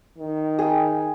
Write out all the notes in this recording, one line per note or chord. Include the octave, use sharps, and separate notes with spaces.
D#3
G#4 G5